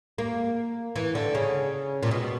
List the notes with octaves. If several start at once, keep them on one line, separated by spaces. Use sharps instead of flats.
A#3
E3
D3
C#3
A#2
B2